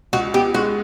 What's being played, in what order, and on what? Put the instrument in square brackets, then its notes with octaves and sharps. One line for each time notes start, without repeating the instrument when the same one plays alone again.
[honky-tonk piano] C#2 [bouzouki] F#4
[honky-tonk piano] B3 [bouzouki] G4
[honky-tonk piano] G#3 [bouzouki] F#4